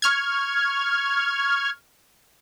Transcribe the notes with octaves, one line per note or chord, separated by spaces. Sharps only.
C#6 F6 G#6